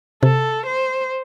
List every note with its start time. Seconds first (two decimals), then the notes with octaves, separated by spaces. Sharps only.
0.23 C3 A4
0.66 C5